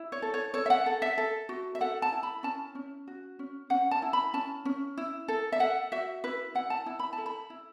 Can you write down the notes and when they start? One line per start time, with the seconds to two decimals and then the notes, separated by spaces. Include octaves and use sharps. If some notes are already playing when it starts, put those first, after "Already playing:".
Already playing: E4
0.12 C#5
0.22 A4
0.34 C#5
0.54 A4 C#5
0.66 E5
0.70 F#5
0.86 A4
1.02 E5
1.18 A4
1.49 F#4
1.75 E5
1.81 A4 F#5
2.02 A5
2.12 E4
2.23 B5
2.43 C#4 A5
2.75 C#4
3.08 F#4
3.39 C#4
3.70 C#4 F#5
3.91 A5
4.02 E4
4.13 B5
4.33 C#4 A5
4.65 C#4
4.97 E4
5.28 A4
5.52 E5
5.59 A4 F#5
5.92 F#4 E5
6.24 E4 B4
6.55 E4 F#5
6.70 A5
6.86 E4
6.99 B5
7.13 A5
7.18 A4
7.26 B5
7.50 E4